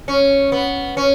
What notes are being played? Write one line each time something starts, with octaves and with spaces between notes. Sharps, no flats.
C#4
B3
C#4